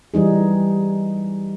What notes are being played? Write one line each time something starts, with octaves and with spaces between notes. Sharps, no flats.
E3 G3 D#4 G#4